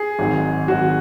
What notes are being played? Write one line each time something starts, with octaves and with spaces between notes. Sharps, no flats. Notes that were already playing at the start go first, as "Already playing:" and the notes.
Already playing: G#4
G#1 G#2 F#3
G#1 G#2 F#3 F#4